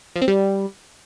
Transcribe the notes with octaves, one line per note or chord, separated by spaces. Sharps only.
F3
C4
G3